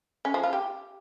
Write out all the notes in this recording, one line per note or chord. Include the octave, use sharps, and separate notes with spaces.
C#4
F3
F4
G4